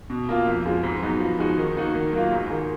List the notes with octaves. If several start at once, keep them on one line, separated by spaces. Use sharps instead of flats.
B2
A#3 F4
F2
F3 G#3
G#2
F#3 B3 D#4
F3
G#3 D#4 F#4
D#3
A#3 D#4 F#4
D#3
F#3 A#3 F4
G#2
D#3 G#3